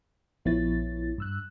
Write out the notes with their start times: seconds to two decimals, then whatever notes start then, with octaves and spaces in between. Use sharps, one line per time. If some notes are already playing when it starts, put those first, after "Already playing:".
0.45 A#1 F3 B3 E4 C#5 A6
1.18 G2 E6 F#6